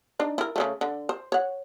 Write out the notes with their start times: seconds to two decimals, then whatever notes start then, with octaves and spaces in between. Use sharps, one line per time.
0.20 D4 D#4
0.38 E4 A#4
0.56 C#3 G3 A3
0.81 D3
1.09 C5
1.32 C#5 F#5